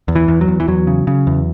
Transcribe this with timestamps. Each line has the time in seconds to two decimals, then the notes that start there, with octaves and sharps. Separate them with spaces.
0.08 E2
0.15 E3
0.28 E2
0.41 F#3
0.48 E2
0.60 E3
0.68 E2 F#3
0.87 C#3
1.07 C#3
1.27 E2